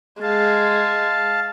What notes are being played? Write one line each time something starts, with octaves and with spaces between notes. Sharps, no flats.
G#3 F5 A5